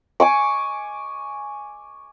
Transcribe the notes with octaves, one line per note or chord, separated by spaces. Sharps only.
G#5 C#6 D6